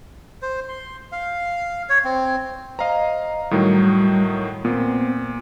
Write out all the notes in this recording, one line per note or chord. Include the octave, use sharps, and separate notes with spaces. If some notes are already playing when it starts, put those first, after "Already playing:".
C5
C6
F5
C#5
C4
C5 D#5 F5 A#5
A2 D#3 F#3 G3
A#2 B3 C4